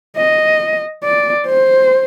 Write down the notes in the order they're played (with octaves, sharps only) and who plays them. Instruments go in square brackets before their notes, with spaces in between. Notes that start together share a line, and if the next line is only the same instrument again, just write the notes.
[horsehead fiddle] D#5
D5
C5